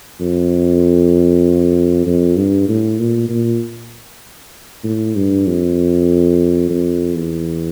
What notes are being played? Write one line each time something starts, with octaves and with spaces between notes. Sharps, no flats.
F2
F2
G2
A2
A#2
A#2
A2
G2
F2
F2
E2